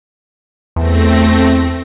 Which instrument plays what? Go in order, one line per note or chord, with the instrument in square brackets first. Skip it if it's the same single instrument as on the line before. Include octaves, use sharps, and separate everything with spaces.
[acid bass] E2 [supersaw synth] A3 C4 A#6